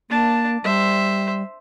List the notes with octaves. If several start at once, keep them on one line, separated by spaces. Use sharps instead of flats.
A#3 D4 A5
G3 C5 E5